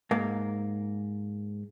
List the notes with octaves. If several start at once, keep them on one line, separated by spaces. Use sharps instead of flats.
G#2 A#3